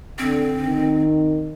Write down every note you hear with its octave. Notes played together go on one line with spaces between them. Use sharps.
D3 C4
D#3